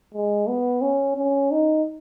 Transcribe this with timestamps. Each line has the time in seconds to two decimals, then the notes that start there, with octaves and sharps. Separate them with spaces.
0.14 G#3
0.48 B3
0.82 C#4
1.17 C#4
1.51 D#4